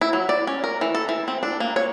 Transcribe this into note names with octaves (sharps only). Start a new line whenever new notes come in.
E4
F#3
D5
C#4
A#4
E3
A4
E3
C4
D4
A#3
C#5